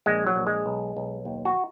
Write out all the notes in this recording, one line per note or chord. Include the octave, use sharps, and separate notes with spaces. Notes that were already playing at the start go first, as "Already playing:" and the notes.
A#1 G#3
F#3
A#1
G#3
B1
B1
D#2
F#4